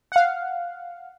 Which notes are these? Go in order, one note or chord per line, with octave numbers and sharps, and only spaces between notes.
F5 F#5